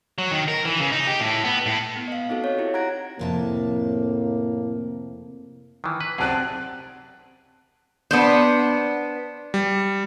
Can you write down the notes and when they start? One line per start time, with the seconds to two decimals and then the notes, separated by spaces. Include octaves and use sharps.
0.18 F#3
0.32 D#3
0.48 A#4
0.65 E3
0.80 C#3
0.92 D#4
1.07 G4
1.20 A2
1.44 B3
1.66 A2
1.97 B3
2.08 D#5 F5
2.29 C4 D#4 F#4 A4
2.44 C#5
2.58 E4 G4
2.74 F#5 A#5 F#6 G#6 A#6 D7
3.19 F2 A2 C3 A#3 A5
5.84 D#3 E3
6.01 B4
6.18 F#2 C3 C4 G#4 D5 F#5 A5 F#6
8.11 B3 D4 C5
9.54 G3